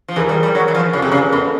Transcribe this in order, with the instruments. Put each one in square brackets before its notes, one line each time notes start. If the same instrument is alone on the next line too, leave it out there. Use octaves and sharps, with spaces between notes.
[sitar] F3
[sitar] E3 [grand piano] G#4 A#4
[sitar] G3
G3
F#3
E3
F3
[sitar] C#3 [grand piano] G4 A4
[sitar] C3
[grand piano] G#4 A#4
[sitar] C#3
[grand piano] A4 B4
A#4
[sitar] B2 [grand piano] A4 B4